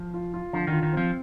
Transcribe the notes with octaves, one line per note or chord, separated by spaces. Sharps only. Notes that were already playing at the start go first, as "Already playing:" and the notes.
Already playing: F3
F4
F4
D3 F3
D#3 F4
D#3
F3 C4